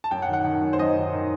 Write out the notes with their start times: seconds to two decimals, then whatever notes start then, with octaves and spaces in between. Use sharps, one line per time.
0.04 A5
0.11 F#2 G5
0.22 F#5
0.28 D#3
0.33 F#5
0.44 D#3
0.62 F#2
0.73 C5
0.79 F#2 D#5
0.96 D#3
1.13 D#3